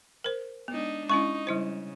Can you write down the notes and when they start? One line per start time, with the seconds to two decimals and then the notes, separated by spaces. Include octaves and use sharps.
0.24 A#4 C5
0.68 G#3 B3 D4 D#4
1.10 G#3 C#4 D#4 E4 C#6
1.47 C#3 G3 E4 C5